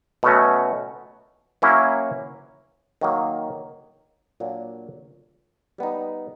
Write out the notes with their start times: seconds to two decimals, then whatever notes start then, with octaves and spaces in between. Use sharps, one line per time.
0.23 B2 F#3 A3 C#4 F#4
1.62 F#3 A#3 C#4 E4
3.01 D#3 F#3 A#3
4.40 A#2 F#3 A#3 D4
5.78 G3 B3 D#4